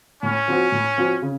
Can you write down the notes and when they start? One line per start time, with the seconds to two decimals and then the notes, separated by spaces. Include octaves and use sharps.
0.23 A2 C#4
0.48 F3 C4 F#4
0.72 A2
0.98 F3 C4 F#4
1.22 C#3